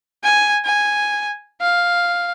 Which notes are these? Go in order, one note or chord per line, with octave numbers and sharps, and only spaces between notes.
G#5
G#5
F5